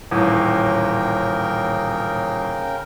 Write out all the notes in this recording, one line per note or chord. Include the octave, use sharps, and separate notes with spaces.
D#1 A1 C#3 A#4 G5